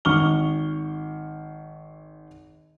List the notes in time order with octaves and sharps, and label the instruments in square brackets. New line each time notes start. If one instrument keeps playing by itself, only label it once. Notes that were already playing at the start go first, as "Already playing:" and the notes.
[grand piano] G#1 C#6 F6 G7